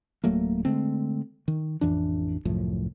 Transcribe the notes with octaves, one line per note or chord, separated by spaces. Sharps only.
D1 F#3 A3 A#3
D3 G#3 A3 C4
D#3
A1 F2 E3 D4
C2 F#2 A2 F3